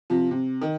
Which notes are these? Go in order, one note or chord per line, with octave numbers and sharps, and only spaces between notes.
C3 F3
C3
D#3